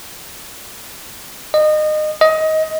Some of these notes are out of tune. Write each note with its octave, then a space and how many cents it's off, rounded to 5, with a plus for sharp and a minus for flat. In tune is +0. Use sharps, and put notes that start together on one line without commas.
D#5 -25
D#5 +20